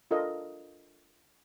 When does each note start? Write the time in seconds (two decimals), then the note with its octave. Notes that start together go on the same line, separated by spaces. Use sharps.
0.11 D4 F4 A4 A#4 D#5